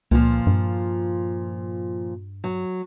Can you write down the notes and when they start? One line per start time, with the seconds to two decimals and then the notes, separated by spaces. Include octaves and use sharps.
0.11 C#2 A#2 F3
0.47 G2
2.44 F#3